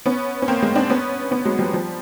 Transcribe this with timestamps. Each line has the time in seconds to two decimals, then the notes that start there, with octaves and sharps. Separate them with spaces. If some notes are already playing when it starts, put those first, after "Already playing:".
0.06 B3 C#4
0.42 C#4
0.48 A#3 C4
0.62 G#3 A#3
0.75 C4 D4
0.90 B3 C#4
1.31 B3 C#4
1.45 F#3 G#3
1.59 F3 G3
1.73 F3 G3